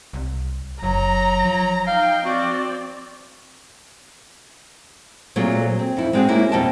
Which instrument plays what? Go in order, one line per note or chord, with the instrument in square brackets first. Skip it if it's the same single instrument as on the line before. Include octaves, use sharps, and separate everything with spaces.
[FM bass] C2
[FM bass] F#1 [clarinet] F#3 [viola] A#5
[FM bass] F3
[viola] D#4 G5 [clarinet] F5
[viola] C4 D5 [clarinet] F#4
[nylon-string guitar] A#2 F#3 A3 C4 F4 G#4
C4
F2 E4
G#3 B3 C4 D4 F#4 G#4
A#3 C#4 E4
F2 B2 G3 D#5 G5 A5